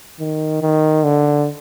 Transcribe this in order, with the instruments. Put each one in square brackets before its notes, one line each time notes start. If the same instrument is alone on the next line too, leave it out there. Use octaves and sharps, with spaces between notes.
[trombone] D#3
D#3
D3